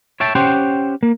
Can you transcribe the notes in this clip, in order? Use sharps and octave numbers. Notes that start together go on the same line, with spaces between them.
C#5 E5 G5 A5
C#4 G4 C5 F#5 G5 C6
A#3